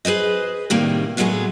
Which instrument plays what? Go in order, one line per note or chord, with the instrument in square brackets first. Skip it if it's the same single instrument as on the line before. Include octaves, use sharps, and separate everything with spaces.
[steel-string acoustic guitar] G#4 B4 C5 D#5
A2 C3 D#3 G3 A#3
A2 F#3 G#3 A3 B3 G#4